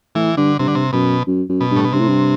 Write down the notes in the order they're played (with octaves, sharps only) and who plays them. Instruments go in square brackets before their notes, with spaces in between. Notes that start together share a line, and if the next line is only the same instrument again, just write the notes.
[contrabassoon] A2 [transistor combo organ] E3
[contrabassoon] G2 [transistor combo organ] D3
[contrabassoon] G2 [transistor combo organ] C3
[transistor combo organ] D3
C3
[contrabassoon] F#2 [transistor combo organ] B2
[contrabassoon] F#2
F#2
[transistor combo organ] B2
[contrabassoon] G2
[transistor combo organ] A2
B2
[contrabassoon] G2 [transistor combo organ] C3
[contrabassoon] A2
G2